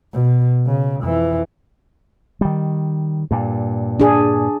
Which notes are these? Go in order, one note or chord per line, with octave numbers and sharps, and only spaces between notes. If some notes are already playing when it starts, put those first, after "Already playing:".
B2
C#3
F2 E3
D#3 G3
G2 A#2
D4 G#4